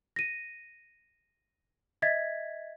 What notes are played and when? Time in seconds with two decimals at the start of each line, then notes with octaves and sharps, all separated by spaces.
0.16 A#6 D#7
2.02 D#5 E5 G#6 A6 B6